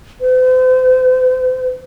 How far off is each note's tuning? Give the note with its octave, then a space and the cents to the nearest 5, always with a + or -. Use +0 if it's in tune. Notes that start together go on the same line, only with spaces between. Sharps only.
C5 -40